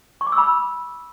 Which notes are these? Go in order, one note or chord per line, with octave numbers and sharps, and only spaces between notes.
C#6
D6
E6
B5
E6